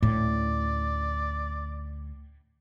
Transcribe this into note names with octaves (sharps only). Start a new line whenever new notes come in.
D2 A2 C#4 D5